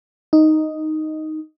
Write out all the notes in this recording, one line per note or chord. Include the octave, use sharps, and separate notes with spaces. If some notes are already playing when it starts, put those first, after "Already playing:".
D#4